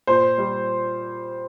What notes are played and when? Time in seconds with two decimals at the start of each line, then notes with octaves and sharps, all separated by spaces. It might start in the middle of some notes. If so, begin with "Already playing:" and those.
0.07 A#2 C5
0.38 G3